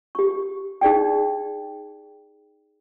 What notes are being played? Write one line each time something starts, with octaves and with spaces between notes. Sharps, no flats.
G4 C#6
D#4 G#4 D5 G5